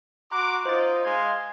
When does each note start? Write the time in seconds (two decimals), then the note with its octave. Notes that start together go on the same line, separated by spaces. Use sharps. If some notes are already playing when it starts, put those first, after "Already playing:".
0.31 F#4 A#5 C6 D6 F#6
0.65 D#4 F4 C5 D#5 A6
1.05 G#3 F5 C6 G#6